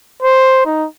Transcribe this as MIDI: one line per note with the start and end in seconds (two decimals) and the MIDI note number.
0.22 0.65 72
0.65 0.86 63